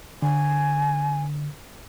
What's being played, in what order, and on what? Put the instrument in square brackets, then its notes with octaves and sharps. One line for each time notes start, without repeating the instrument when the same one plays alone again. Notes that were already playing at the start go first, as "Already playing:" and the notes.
[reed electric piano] D3 [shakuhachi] G#5